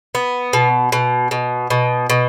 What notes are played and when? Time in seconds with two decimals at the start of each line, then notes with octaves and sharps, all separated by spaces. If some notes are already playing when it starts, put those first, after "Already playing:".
0.15 B3
0.53 B2
0.92 B2
1.31 B2
1.70 B2
2.10 B2